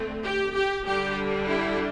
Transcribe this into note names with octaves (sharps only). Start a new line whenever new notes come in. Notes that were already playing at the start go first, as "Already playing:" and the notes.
Already playing: D3 A3 C4
G4
G4
D3 G3 D4 G4
E4